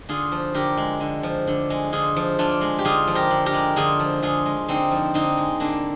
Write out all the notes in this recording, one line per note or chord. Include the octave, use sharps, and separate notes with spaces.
D3 F4 G#4
F3
D3 G4 A#4
G#3
D3
F3
D3
G#3
D3 F4 G#4
F3
D3 D4 F4
G#3
G4
D3 F4 G#4
F3
G4 A#4
D3
G4 A#4
G#3
D3 F4 G#4
F3
D3 F4 G#4
G#3
D3 C4 D#4
F3
D3 C4 D#4
G#3
D3 A#3 D4